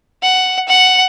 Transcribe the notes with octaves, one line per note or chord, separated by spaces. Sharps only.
F#5
F#5